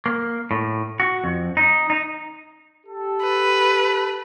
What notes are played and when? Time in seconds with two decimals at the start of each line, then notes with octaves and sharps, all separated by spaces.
0.06 A#3
0.51 A2
1.00 F#4
1.24 F2
1.57 D#4
1.90 D#4
2.86 G4 A4
3.23 B4